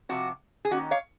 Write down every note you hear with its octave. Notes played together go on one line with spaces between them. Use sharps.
C3 F3 C4 F#4
G#4
D#3 A#3 C#4 F#4
C#5 F5